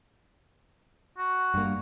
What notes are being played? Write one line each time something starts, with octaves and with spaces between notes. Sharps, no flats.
F#4
G2 A#3